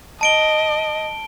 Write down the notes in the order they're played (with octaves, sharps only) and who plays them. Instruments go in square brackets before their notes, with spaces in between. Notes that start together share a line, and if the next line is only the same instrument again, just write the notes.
[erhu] D#5 [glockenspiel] A5 D7 G7